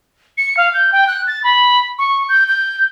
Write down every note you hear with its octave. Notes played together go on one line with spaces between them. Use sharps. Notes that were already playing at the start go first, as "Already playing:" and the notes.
C#7
F5
G6
G5
F#6
A6
B5
C#6
G6
G6